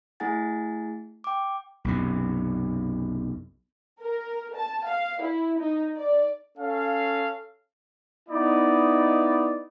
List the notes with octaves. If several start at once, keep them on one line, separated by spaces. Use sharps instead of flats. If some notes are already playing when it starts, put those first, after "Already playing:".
A3 E4 G#4 F#5 G#5 A6
G5 D6
B1 F#2 C3
A#4
A5
F5
E4
D#4
D5
C#4 A4 F5
B3 D#4 E4 D5 D#5